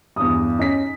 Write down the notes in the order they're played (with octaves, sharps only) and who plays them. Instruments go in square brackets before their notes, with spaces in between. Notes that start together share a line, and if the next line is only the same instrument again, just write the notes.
[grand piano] E2 G2 [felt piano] D#6
[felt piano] C#4 [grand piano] D#4 B6